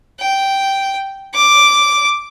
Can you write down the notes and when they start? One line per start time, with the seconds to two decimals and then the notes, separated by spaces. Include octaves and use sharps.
0.20 G5
1.34 D6